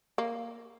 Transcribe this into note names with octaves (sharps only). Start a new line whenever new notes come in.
A#3